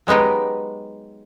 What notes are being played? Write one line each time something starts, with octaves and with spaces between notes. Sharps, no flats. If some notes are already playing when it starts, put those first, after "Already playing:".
F#3 G#3 B3 D#4 G4